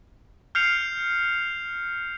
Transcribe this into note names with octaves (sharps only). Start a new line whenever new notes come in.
F6 G6 C7 C#7 F7